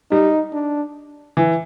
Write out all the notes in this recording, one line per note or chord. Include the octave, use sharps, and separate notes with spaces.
G3 D#4
D4
E3